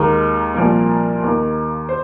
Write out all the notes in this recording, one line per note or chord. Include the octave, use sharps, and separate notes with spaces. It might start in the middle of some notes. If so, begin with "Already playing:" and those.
Already playing: D#2 D#3 G#3 A#4
C2 A#2 F3 A#3
D#2 D#3 A#3
C5